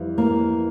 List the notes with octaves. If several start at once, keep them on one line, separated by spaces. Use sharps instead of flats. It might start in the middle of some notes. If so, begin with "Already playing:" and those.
Already playing: F2 E3 G3
A#3